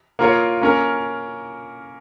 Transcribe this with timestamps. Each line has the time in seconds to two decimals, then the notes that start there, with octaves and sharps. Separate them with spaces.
0.19 A#3 F4 A#4 C#5
0.61 A#3 C#4 A#4